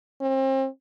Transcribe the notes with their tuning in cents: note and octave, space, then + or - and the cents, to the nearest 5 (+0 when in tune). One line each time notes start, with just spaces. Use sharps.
C4 +35